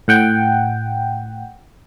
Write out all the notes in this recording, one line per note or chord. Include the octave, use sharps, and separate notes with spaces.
A2 F#5 G5